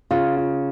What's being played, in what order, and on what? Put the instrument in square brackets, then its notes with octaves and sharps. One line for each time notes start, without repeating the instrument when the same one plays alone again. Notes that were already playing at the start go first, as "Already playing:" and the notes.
[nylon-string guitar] C#3 [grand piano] F4
[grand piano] F4